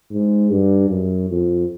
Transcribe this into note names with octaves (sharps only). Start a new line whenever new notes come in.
G#2
G2
F#2
F2